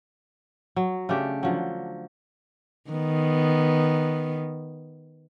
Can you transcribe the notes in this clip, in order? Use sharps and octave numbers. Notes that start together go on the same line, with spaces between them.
F#3
C#3 A3 D4 G4
D3 F3 F#3
D#3 B3